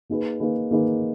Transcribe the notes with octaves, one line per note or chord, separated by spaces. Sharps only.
A#3 D#4 G#4 B4
A#3 D#4 G#4 B4
A#3 D#4 G#4 B4